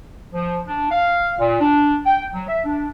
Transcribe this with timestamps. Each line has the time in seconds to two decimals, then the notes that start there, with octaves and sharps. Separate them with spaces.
0.33 F3
0.67 D4
0.91 F5
1.39 A#2
1.60 D4
2.06 G5
2.33 F#3
2.48 E5
2.64 D4